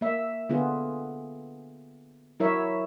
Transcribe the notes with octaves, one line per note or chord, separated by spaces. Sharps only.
A#3 E5
D3 B3 F4 G#4
F#3 E4 A#4 C#5 E5